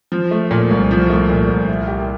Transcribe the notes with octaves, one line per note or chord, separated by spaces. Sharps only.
F3
A3
A#2
C2
F3
A3
A#2
C2
E4
G4